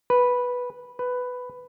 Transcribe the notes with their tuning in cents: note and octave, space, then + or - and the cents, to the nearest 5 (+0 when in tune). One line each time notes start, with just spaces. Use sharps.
B4 -5
B4 +10